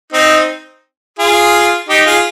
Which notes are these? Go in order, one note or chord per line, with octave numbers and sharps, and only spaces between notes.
C4 D#4
F4 G#4
D#4 G4
F4 G#4